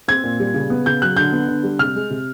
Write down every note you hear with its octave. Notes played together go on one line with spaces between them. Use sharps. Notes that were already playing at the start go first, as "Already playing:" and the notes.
C4 G#6
A#2
G3
C#3
B3
C#3 G6
F#3 F#6
D3 G6
B3
D3
G3
C3 F6
G#3
C3